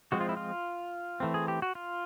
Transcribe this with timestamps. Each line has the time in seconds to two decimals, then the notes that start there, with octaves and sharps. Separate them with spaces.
0.12 F3 G#3 C4 F#4
0.21 F4
0.29 E4
0.37 F4
1.20 E3 A3 C4
1.34 G#4
1.48 G4
1.62 F#4
1.75 F4